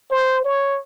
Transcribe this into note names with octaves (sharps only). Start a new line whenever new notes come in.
C5
C#5